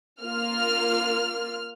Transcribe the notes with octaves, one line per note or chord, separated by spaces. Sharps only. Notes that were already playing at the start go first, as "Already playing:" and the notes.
A#3 F4 F6